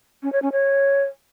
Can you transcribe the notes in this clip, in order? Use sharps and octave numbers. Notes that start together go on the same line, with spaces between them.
C#4
C#5
C#4
C#5